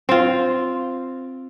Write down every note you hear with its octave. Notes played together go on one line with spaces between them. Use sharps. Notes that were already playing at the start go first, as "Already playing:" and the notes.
C4 F4